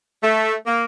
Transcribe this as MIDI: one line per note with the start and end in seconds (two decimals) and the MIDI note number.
0.22 0.54 57
0.66 0.85 58